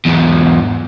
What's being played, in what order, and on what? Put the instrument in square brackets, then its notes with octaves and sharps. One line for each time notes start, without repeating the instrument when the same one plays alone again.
[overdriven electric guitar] E2 G#2